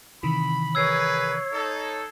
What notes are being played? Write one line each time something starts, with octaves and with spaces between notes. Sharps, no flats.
C3 D#3 E3 B5
G#4 A#4 B4 C#5 E6 G#6 C7
D#4 A4